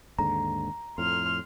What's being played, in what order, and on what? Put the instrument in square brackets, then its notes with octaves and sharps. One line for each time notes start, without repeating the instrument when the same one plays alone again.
[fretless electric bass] D#2 G#2 D3 [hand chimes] A#5
[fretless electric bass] F2 A2 [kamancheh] C6 F6